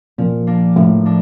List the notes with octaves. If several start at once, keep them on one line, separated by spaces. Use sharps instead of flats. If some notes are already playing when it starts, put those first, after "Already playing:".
A#2 F3
A#3 D4
A2 F3
A#3 D4